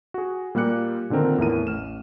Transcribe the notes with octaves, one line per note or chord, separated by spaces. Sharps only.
F#4 G#4
A#2 G3 A#3 G4 F#6 C#7
A#2 D3 D#3 C4 A#4
E2 A2 A#4 D#7
A1 F6 E7